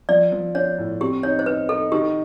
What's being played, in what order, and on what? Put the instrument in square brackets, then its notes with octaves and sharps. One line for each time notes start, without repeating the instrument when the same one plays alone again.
[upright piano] F3 [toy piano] D5
[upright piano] F3
[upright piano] D4 [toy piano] C#5
[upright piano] A2
[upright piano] C4 [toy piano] G4
[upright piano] D#4 [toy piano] C#5
[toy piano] C5
[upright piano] D#4 [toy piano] B4
[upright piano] D#4 [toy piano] A4
[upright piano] D#3 [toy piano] G4